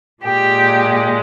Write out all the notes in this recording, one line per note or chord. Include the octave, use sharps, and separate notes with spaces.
A#2 G#3 G4